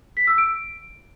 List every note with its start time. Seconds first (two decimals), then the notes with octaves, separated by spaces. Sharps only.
0.17 B6
0.27 E6
0.38 D7